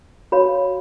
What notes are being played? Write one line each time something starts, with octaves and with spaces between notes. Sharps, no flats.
F#4 C#5 F5 B5